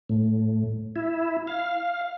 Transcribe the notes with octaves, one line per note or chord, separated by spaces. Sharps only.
A2
E4
F5